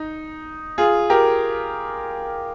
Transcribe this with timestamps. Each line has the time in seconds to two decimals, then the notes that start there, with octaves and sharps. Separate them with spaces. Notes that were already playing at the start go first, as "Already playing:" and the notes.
Already playing: D#4
0.78 F4 G#4
1.10 G4 A#4